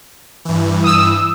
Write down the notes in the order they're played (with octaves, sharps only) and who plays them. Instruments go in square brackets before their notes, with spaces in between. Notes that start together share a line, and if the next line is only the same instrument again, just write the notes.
[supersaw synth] G2 E3
[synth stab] D#6 E6